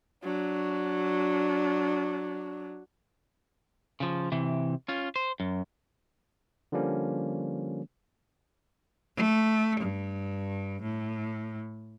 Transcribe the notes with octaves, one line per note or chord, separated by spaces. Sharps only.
F#3 D4
C#3 F3
C3 E3
C#4 F4
C5
F#2
D3 F3 G3 A#3 C#4
A3
G2
A2